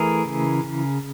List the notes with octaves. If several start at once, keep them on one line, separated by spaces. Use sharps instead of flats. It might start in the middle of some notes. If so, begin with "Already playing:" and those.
Already playing: E3 A3 G#4 A#4
C#3
C#3